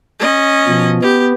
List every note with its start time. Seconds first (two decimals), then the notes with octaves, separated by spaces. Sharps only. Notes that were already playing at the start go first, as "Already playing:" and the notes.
0.20 C#4 D#5
0.67 B2 F3
1.02 B3 G4